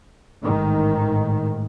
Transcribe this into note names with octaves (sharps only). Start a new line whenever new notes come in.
A1 G#2 D#3